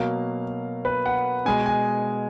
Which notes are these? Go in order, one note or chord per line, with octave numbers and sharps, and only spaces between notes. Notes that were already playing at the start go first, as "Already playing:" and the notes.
Already playing: B2 F#3 A#3 F5
B4
F#5
B2 G#3 G#5
G#5